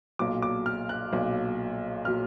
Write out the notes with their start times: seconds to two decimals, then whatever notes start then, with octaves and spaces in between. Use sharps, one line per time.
0.19 B1 A#2 F#3 D6
0.42 D6
0.66 F6
0.89 F#6
1.12 B1 A#2 F#3
2.05 A#2 F#3 F6